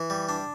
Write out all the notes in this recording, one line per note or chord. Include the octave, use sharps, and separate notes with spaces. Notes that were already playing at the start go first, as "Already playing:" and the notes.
Already playing: E3
G3
D4